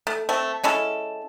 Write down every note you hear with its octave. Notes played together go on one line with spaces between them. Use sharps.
A3
A3 C4
G#3 C#4 E4 A4